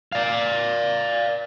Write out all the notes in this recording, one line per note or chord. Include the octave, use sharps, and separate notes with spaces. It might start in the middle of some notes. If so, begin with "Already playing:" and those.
D5 F5